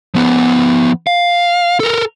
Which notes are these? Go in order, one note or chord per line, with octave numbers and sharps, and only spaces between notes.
F3 B3
F5
A4 A#4